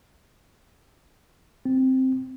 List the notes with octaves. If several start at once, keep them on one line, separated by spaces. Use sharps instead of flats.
C4